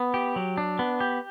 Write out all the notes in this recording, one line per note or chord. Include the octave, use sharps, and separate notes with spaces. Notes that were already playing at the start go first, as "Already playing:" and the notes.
Already playing: B3
G4
F#3
D4
B3
G4